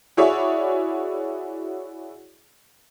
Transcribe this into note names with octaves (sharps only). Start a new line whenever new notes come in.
E4 F#4 G#4 C#5 D5 E5